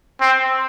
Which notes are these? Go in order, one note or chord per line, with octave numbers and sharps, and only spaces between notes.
C4